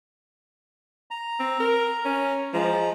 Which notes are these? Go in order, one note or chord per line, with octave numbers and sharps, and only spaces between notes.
A#5
C4
A#4
C#4
F3 G#3 A#5